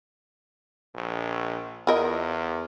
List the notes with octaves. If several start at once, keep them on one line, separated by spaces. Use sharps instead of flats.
A#1
E2 F4 A#4 D#5